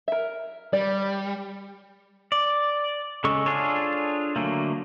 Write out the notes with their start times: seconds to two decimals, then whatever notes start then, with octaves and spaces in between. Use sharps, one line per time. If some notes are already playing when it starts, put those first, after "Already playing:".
0.08 A#4 E5
0.73 G3 D5
2.32 D5
3.24 C#3 G#3 A4 C#6
3.46 D4 F4 G#4 A4 C#5
4.36 D3 F#3 A3 A#3